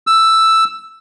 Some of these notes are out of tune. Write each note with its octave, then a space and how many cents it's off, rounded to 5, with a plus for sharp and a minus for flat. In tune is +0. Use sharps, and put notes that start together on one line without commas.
E6 +5